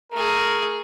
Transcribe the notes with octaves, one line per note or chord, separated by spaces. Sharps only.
A3 G#4 A#4